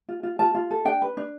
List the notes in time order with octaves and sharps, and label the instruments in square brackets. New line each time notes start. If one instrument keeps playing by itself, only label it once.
[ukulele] F4
F4
F4 A5
F4
A4
D4 G5
B4
D4